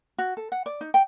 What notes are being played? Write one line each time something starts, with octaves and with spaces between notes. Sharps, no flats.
F#4
A4
F#5
D5
D#4
G5